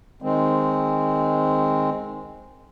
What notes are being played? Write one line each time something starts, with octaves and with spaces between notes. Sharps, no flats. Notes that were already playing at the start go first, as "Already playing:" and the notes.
D#3 G#3 C4